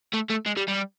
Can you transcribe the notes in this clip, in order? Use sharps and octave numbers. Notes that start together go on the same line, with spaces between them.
A3
A3
G#3
G3
G3